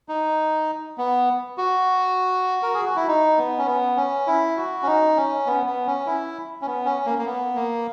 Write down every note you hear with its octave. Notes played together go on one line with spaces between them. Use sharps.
D#4
B3
F#4
A#4
G#4
F#4
E4
D#4
B3
C#4
B3
C#4
E4
F#4
C#4
D#4
C#4
B3
B3
C#4
E4
C#4
B3
C#4
A#3
A#3
B3
A#3